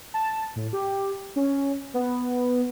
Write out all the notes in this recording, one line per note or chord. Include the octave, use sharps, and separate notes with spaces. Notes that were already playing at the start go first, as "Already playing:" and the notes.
A5
A2
G4
C#4
B3